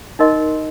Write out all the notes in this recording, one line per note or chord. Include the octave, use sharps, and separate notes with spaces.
D#4 A#4 D#5 C6